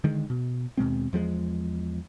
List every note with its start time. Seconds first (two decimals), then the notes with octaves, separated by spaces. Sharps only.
0.04 D3 D#3 G#3
0.30 B2
0.78 D#2 B2 G#3 C4
1.13 E2 F3 F#3 G#3